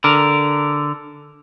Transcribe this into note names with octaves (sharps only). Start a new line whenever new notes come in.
D3 A#4